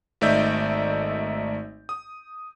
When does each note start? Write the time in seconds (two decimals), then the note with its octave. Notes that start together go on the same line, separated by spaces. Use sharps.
0.21 G#1 A3 D#4 D5 E5 G6
1.89 D#6